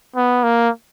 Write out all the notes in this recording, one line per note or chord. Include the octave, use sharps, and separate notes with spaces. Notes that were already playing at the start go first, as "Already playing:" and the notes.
B3
A#3